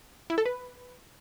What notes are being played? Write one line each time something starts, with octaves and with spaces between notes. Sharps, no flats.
E4
A4
B4